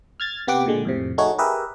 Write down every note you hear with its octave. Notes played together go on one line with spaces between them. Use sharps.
F6 G#6 A6
C3 B3 G4 F#5 D6
A#2 D3 G#3
F2 A2 C3
A3 D#4 F#4 G#4 C#5
G4 G#4 A#4 B4 E5